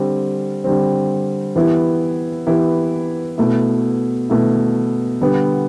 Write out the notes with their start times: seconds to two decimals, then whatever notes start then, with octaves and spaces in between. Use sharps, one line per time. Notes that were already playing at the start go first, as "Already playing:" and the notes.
Already playing: D3 G3 C4
0.64 D3 G3 C4
1.56 E3 B3 E4 G4
2.47 E3 B3 E4 G4
3.38 B2 A3 E4
4.30 B2 A3 E4
5.21 D3 G3 B3